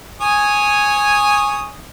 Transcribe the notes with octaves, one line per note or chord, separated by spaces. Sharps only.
C#5 G#5 D#6